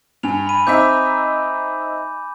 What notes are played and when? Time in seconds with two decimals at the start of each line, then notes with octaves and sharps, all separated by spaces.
0.23 G2 G#5 F7
0.47 B5 D#7
0.67 C4 D#4 E5 D6 G6